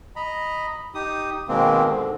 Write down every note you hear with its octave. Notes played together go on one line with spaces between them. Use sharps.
D#5 A#5 B5
D#4 G4 D#6
B2 D#3 G#3 A#3 C4
G#2 D3